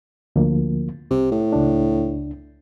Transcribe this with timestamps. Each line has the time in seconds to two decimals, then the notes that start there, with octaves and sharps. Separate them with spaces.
0.36 D2 F3 A#3
1.11 C2 C3
1.31 A2
1.53 C#2 D4